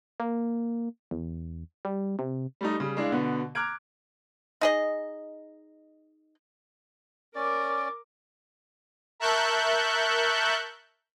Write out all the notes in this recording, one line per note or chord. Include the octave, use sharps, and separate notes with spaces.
A#3
E2
G3
C3
G3 A3 D#4
C#3 G3
G#3 D4 E4 F5
B2 D3 B3
A#5 D6 F6 F#6 G#6 D7
D#4 G#4 D#5
C#4 A#4 D5 D6
A#4 E5 A5 C#6 F#6 G6